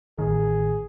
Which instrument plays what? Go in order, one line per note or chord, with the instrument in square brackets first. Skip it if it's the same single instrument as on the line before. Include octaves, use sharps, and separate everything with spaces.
[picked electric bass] A1 A2 D#3 [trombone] G#4